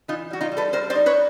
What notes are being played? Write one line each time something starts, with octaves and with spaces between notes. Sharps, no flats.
E3 D#4 F4
G3 F#4
D#4 F4
G3
A4 B4
G3 A#4 C5
C5 D5
D#4
B4 C#5